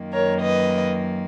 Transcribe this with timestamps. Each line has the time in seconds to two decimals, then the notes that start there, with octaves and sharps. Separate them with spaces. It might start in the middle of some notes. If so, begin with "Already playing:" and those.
Already playing: F#2 D#3 A#3
0.13 A#4 C#5
0.41 B4 D#5